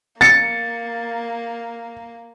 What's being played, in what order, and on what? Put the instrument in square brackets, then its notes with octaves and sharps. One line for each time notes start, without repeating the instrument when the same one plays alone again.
[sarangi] A#3 [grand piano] A6 C#7